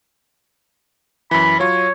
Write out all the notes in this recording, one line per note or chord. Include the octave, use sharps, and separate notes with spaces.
F#2 E3 B5
F#3 F4 C#5